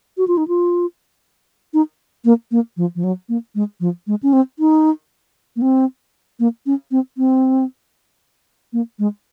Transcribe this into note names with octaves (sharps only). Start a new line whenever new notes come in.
F#4
F4
D#4
F4
D#4
A#3
A#3
F3
F3
F#3
A#3
G#3
F3
G#3
C#4
C4
D#4
A#3
C4
A#3
C#4
C4
C4
A#3
G#3